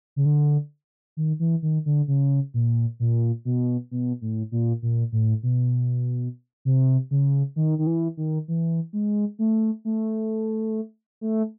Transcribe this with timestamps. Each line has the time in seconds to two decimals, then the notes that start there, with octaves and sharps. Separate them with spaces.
0.16 C#3
0.25 D3
1.17 D#3
1.39 E3
1.62 D#3
1.86 D3
2.08 C#3
2.54 A#2
3.00 A#2
3.45 B2
3.91 B2
4.21 A2
4.52 A#2
4.82 A#2
5.12 A2
5.43 B2
6.65 C3
7.11 C#3
7.56 D#3
7.78 D#3
7.87 E3
8.17 D#3
8.48 E3
8.93 G#3
9.39 A3
9.85 A3
11.21 A3